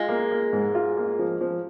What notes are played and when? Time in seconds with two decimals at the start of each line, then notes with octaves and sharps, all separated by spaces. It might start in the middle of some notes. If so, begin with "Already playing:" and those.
Already playing: G#3 F4
0.09 A#3
0.31 A#3
0.53 G#2
0.75 F4
0.97 A#3
1.19 F3
1.41 F3